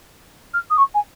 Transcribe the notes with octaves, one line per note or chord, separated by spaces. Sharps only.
F6
D#6
C#6
G#5